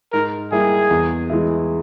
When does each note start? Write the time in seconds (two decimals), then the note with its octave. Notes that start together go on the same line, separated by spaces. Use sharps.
0.13 G#2 A#4
0.52 G3 A#3 E4 G#4
0.91 E2
1.30 E3 G#3 E4